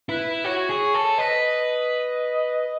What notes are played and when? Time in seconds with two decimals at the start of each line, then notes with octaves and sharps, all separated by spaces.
0.08 E4 B4
0.44 F#4 C#5
0.69 G#4
0.94 A4
1.18 B4 D#5